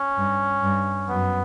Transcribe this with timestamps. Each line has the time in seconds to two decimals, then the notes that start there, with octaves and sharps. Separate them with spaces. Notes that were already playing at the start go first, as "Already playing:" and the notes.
Already playing: C#4
0.17 G2
0.63 G2
1.09 F#2 B3